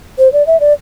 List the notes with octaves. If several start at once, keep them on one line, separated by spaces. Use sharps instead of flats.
C5
D5
E5
D5